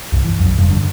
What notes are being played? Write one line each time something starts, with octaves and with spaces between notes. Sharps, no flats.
C2 G2
E3
B1 F#2
F1 G2
D3